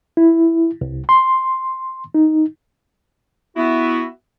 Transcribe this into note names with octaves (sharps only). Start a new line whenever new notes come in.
E4
C2
C6
D#4
B3 E4 F#4 E5